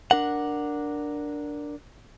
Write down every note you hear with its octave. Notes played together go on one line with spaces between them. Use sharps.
D4 A#4 F#5